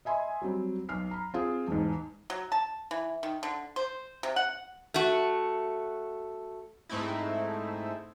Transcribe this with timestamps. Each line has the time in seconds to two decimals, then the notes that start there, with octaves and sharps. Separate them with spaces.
0.05 D#5 E5 G#5 B5 C6
0.42 F#3 G3 C4
0.89 B1 F6 C7
1.11 A#5 B5
1.34 C4 F4 G#4
1.67 E1 G#2
2.30 F#3
2.52 A5
2.91 E3
3.23 D#3
3.43 D3
3.76 C5
4.23 C3
4.36 F#5
4.94 A3 F#4
6.89 G#2 A3 C4 D#4 E4